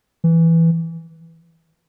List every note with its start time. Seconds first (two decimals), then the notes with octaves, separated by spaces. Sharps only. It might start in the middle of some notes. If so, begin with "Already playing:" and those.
0.24 E3